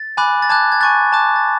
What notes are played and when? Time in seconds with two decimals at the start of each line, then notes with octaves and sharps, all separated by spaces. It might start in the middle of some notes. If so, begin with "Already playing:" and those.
Already playing: A6
0.17 G#5 B5 D6 F#6
0.42 A6
0.49 A5 D6 F#6 G#6
0.72 G#6
0.81 G#5 C#6 F#6 A6
1.13 A5 D6 F#6
1.36 A6